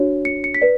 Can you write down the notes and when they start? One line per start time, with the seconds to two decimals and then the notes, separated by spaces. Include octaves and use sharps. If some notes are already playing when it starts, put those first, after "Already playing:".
Already playing: D4 F#4 C#5
0.25 C#7
0.44 C#7
0.54 B6
0.62 B4 D5